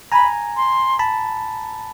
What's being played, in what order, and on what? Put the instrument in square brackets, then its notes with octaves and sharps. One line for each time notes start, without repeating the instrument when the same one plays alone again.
[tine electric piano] G#5 A#5 [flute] B5
[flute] C6
[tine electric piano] A5 B5